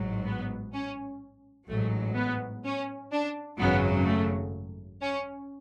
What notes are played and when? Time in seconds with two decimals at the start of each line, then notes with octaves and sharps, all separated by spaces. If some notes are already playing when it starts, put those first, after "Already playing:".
Already playing: A1 G#2 F#3
0.26 B3
0.74 C#4
1.69 A1 G#2 F#3 A3
2.16 B3
2.65 C#4
3.12 D4
3.59 G#1 F#2 C#3 F#3 B3
4.06 A3
5.01 C#4